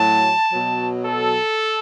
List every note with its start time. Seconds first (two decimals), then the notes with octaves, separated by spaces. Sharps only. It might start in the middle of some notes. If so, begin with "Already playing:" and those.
Already playing: A2 F#3 A5
0.52 B2 F#3
1.06 A4